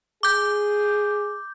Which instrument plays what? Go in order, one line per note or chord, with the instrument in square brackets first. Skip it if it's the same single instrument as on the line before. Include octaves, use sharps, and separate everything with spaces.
[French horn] G#4 [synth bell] D6 G6